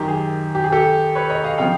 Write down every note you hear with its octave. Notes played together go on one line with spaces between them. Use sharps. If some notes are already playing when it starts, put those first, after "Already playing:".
Already playing: F#2 D#3 G4
G#4
G4
G#4
G4 A4
B4 C#5
C#5 D#5
D#5 F5
C#3 F3 F5 G5